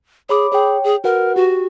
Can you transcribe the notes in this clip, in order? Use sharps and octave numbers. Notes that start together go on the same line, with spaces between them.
G#4 C#5 B5 D6
G#4 C#5 G5
G#4
F#4 A#4 B4 F#5
F#4 G4